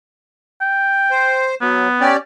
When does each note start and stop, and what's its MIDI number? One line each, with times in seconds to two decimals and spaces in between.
0.62 1.45 79
1.11 1.55 72
1.61 1.88 54
1.61 2.10 59
2.00 2.17 61
2.00 2.17 67
2.00 2.17 74